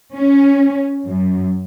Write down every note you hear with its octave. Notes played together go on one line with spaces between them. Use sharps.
C#4
F#2